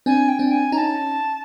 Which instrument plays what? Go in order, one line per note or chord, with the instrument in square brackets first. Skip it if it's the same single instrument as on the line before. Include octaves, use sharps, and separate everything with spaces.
[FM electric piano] C4 D4 [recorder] G#5
[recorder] G5
[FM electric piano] C4 D4
[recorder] G#5
[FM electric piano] C#4 D#4 [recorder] A#5
[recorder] A5